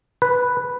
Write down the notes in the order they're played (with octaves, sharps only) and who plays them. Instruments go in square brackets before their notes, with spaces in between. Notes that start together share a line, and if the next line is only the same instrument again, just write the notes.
[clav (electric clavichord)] B4